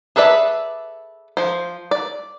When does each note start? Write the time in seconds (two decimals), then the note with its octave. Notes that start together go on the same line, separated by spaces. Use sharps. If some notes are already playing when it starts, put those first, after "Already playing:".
0.16 G#4 A4 B4 D5 E5
1.37 F3 C5
1.91 D5